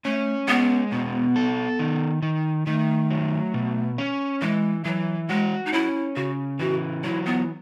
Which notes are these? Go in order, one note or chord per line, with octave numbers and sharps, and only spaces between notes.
A3 C#4
G#3 B3
B2 B3
A4
D#3
D#3
D#3 A3
F#3
B2
C#4
E3 G#3
E3 F#3
G#3 F#4
D#4
C#4 E4
C#3 F#4
E3 F#4
F#3 E4
B3